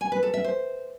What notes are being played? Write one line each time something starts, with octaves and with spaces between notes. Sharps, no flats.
G#5
B4
A4
E5
C5